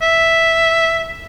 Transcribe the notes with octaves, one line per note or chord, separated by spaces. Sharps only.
E5